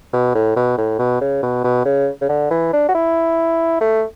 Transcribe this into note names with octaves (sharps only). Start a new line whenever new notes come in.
B2
A2
B2
A2
B2
C#3
B2
B2
C#3
C#3
D3
E3
D4
F#4
E4
A3